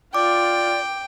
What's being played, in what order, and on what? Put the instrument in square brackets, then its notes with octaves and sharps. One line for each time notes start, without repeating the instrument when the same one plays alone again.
[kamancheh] F4 [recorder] D5 [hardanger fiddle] G5 [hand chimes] D6